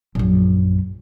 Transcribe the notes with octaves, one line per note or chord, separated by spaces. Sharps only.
A#1 F#2